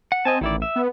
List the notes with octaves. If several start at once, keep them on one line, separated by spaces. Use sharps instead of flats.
F#5
C4 D#5 G#5 A5
A1 D#3 E4 D5
E5
B3